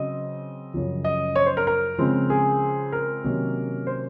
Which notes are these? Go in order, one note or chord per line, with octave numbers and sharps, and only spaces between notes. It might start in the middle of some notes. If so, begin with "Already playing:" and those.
Already playing: C#3 F#3 C4 D#5
F#2 C#3 F3
D#5
C#5
C5
A#4
A#4
C#3 F3 G#3 C4
G#4
A#4
C3 D#3 F#3 A#3 C#4
C5